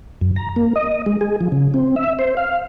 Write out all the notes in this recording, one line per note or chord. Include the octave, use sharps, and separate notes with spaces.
F#2
A#5
A#3
D#5
G#3
G#4
F3
C#3
C4
E5
C5
F5